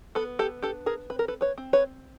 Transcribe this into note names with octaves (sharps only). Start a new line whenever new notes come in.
B3 A4 B4
G4 A4
D4 G4 A4
G#4 A#4
C4 B4
A#4
A4 B4
B4 C#5
C4
B4 C#5